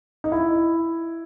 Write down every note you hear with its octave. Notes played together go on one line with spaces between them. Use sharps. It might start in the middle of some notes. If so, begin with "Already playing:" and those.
D#4
E4